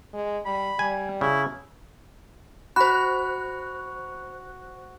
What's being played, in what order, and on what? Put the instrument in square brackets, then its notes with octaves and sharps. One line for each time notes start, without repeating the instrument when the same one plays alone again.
[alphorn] G#3
[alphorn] G3 [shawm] B5
[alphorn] G3 [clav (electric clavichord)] G#5
[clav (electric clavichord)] C#3 [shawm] E4
[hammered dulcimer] F#4 [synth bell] C5 F#6 [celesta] B5